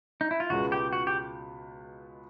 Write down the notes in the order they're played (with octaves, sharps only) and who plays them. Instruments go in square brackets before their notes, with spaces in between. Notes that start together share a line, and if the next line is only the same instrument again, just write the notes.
[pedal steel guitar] D#4
E4
F4
[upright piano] C#2 B2 G#3 B3 [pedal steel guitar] F#4
[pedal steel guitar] G4
F#4
G4